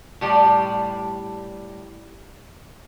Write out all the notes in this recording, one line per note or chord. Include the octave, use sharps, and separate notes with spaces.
A2 G3 D5